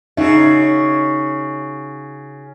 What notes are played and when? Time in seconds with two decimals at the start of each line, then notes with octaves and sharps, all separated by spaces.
0.17 C#3 D#4 F#4 E5